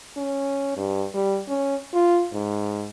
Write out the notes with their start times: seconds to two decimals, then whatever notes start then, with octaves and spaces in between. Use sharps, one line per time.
0.17 C#4
0.77 G2
1.14 G3
1.48 C#4
1.93 F4
2.33 G#2